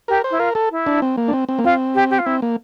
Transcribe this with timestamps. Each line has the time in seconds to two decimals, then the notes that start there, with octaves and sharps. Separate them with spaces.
0.08 G4 A#4
0.24 C5
0.31 E4
0.39 F4 A#4
0.55 A4
0.71 E4
0.87 D4
1.02 C4
1.17 A#3
1.28 D4
1.33 C4
1.49 C4
1.59 A#3
1.64 C4 F4
1.95 G4
2.10 G4
2.19 F4
2.26 C4 E4
2.42 A#3